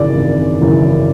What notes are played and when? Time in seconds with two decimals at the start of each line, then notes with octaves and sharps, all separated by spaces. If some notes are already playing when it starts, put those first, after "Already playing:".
Already playing: G#1 F#2 C#3 E3 D5
0.16 G#1
0.61 F#2 C#3 E3